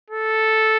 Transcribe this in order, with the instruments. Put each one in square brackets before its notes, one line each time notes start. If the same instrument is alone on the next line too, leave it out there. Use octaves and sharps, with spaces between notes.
[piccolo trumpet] A4